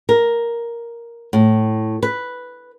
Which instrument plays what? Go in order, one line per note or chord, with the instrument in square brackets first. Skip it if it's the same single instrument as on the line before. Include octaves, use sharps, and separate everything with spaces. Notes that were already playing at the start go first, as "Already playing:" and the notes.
[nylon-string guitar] A#4
A2
B4